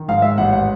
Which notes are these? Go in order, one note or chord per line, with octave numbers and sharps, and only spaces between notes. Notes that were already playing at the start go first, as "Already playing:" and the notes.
Already playing: D#3
G#2 F5
E5
A1 F#5
F#5